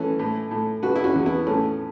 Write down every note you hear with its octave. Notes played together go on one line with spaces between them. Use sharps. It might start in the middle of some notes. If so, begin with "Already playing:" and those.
Already playing: E3 A3 C#4
A2
A2
C#3 F#4 B4
E4
C#4 F#4
E2
B3 E4
A2 A3 C#4